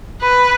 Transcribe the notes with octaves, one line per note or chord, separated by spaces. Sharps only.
B4